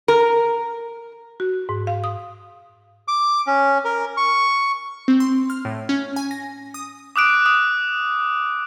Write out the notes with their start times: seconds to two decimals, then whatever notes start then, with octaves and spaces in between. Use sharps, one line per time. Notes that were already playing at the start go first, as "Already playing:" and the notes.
0.08 A#4
1.40 F#4
1.69 G#2
1.87 F5
2.04 D#6
3.08 D6
3.47 C#4
3.85 A#4
4.17 C#6
5.08 C4
5.20 C6
5.50 F6
5.65 A2
5.89 C#4
6.16 G#5
6.31 A#6
6.74 D#6
7.16 D6 D#6 F#6 D7
7.46 D#6